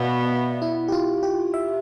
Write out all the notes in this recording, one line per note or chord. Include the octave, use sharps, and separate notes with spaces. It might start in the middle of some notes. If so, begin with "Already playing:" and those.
Already playing: B2 B3 D5 E5 F5
E4
G4
F4
G4
E5